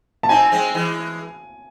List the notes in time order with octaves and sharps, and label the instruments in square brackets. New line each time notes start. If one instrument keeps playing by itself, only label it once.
[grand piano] A5
[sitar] C4 D#4 [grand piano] G#5
[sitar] G#3 C4
E3 G#3